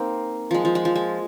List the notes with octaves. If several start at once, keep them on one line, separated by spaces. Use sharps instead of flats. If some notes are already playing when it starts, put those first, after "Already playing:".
Already playing: A#3 C4 D#4
F3 G#3
F3
G#3
F3
G#3